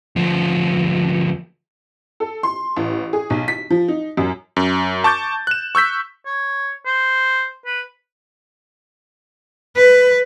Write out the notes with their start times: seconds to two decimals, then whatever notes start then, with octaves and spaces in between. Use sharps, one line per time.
0.16 D2 F3
2.20 A4
2.43 C6
2.76 A1
3.13 G#4
3.30 B1
3.48 B6
3.70 F3
3.88 D#4
4.17 F#2
4.56 F#2
5.04 A5 C#6 D6 G6 A6
5.47 F#6 E7
5.75 C#6 E6 G6 B6
6.26 C#5
6.86 C5
7.66 B4
9.76 B4